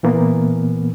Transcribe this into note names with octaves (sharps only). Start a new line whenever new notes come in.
A#2 E3 A#3 B3